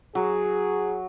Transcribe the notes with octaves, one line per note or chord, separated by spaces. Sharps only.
F#3 G#4